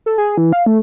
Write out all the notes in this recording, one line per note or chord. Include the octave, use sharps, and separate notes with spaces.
A4
G#4
E3
F5
A3